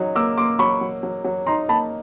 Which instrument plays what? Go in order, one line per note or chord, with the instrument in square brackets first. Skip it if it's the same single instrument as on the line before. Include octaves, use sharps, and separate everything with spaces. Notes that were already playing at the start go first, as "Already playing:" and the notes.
Already playing: [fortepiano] F#3 D#4
[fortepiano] A#3 [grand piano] D6 E6
[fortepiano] A#3 [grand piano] C6 D6
[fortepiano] F#3 [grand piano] B5 C#6
[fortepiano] F#3
F#3
F#3
[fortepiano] D#4 [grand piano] A#5 C6
[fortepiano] A#3 [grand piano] A5 B5